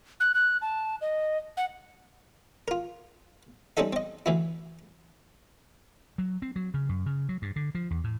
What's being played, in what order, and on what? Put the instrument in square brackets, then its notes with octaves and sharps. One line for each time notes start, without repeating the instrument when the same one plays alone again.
[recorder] F#6
F#6
A5
D#5
F#5
[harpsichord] F4 A#4
G3 C4 C#4 D#4 A4 E5
C4 D#5
D2 E3 E4
[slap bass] F#3
C4
F#3
C#3
F#2
C#3
F#3
G2
D3
F3
E2
A2